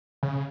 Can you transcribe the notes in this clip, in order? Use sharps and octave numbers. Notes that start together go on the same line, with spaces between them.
C#3